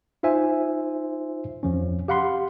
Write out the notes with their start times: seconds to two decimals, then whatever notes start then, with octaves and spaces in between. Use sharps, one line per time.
0.23 D#4 F4 C5 E5 G#5
1.63 F2 F3 C#4
2.08 G4 F5 F#5 B5 C6